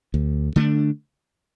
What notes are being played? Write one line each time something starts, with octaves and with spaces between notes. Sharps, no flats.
D2
D3 A3 D4